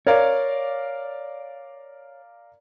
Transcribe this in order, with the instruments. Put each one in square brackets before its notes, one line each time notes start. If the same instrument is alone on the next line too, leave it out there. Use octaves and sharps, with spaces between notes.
[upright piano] A#4 D5 F5 [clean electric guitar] C#5